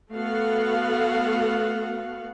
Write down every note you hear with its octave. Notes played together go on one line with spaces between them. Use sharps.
A3 B3 F#4 A4 F5 F#5